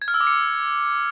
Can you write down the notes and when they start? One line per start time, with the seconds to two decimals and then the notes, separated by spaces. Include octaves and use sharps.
0.02 G#6
0.08 F6
0.14 E6
0.21 D6
0.27 C#7